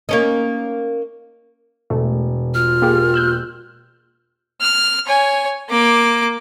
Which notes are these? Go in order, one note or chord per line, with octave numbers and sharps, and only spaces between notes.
A#3 C#4 D#4
E1 A3
F4 F6
A#3 G4 G#4
E6 F#6 G6
F6
C#5 G#5
A#3 D6